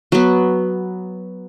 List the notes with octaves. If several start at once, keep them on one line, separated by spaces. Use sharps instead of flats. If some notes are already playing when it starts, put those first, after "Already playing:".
F#3 B3